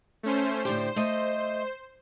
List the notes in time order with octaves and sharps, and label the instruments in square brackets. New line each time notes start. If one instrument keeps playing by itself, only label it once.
[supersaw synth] A3 C#4 C5
[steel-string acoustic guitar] A2 D3 G4 [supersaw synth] C5
[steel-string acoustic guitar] A3 D#5